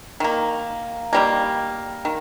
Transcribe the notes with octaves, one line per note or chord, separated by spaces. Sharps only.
D#3 A#3
D#3 G3 A#3
D#3